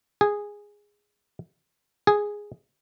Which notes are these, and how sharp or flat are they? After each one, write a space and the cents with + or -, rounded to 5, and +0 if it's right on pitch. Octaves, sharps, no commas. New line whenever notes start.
G#4 -10
G#4 -5